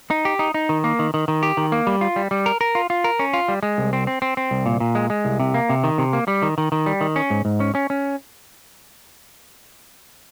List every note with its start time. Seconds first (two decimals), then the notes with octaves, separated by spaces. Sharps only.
0.10 D#4
0.25 G4
0.39 D#4
0.54 D#4
0.69 D#3
0.84 A#3
0.99 D#3
1.14 D#3
1.28 D#3
1.43 G4
1.57 D#3
1.72 A#3
1.87 G3
2.01 F4
2.16 G3
2.31 G3
2.46 A#4
2.61 A#4
2.75 F4
2.90 F4
3.04 A#4
3.19 C#4
3.33 F4
3.48 G3
3.63 G#3
3.78 C2
3.93 C4
4.07 C4
4.22 C4
4.37 C4
4.51 C2
4.66 A#2
4.80 A#2
4.95 G#3
5.10 G#3
5.25 C2
5.40 C3
5.54 A#3
5.69 C3
5.84 D#3
5.98 C3
6.13 A#3
6.28 G3
6.43 D#3
6.58 D#3
6.72 D#3
6.86 G3
7.01 D#3
7.16 C#4
7.30 G#2
7.45 G#2
7.60 C#4
7.75 C#4
7.90 C#4